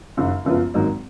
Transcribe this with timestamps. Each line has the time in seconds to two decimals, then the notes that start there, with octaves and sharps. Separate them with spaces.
0.17 F#1 F#2 D#3
0.45 F#1 F#2 F3 B3 F4
0.74 G#1 G#2 F#3 A#3 D#4